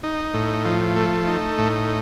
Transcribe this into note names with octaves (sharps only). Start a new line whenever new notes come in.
D#4
A2
F3
A3
D#4
A2